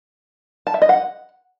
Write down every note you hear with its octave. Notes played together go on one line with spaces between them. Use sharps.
A5
E5
D#5
F#5